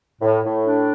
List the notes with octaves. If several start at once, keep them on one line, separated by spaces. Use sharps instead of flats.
A2
A2
D4